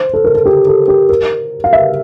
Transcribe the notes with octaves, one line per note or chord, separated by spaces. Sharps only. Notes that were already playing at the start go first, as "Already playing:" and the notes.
Already playing: C5
A4
A#4
A4
G4
A4
G4
A#4
F5
E5